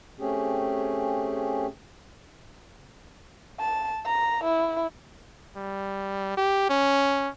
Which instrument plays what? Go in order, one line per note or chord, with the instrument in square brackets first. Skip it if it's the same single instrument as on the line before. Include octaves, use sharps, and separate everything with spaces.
[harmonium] A3 C4 C#4 G4 G#4
[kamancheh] A5
A#5
E4
[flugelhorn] G3
G4
C#4